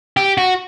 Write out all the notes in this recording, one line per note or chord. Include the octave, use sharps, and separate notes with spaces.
G4
F#4